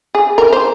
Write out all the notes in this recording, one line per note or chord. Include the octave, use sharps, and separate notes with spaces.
G#4
A#4
C5